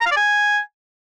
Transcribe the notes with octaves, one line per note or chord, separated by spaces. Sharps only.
A#5
F5
D5
G#5